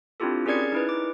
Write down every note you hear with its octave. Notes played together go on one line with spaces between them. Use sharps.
C4 D4 E4 F4 G4 A4
C#4 G#4 A#4 D5 G#6 C#7
D#4 E4 B4
D6